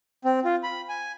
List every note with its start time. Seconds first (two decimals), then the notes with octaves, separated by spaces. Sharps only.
0.25 C4
0.44 F4
0.63 B5
0.89 G#5